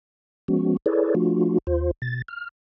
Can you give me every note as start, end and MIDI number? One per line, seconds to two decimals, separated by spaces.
0.48 0.77 53
0.48 0.77 56
0.48 0.77 59
0.48 0.77 61
0.48 0.77 66
0.86 1.14 64
0.86 1.14 68
0.86 1.14 69
0.86 1.14 71
0.86 1.14 73
0.86 1.14 74
1.15 1.58 53
1.15 1.58 57
1.15 1.58 62
1.15 1.58 65
1.15 1.58 66
1.67 1.91 39
1.67 1.91 65
1.67 1.91 72
2.02 2.22 47
2.02 2.22 93
2.28 2.49 89